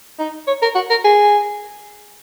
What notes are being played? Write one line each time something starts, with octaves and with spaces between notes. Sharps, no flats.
D#4
C#5
A#4
F#4
A#4
G#4